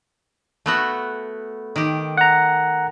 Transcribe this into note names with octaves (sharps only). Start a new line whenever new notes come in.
A3 B3 F#4
D#3 G4
F#5 A#5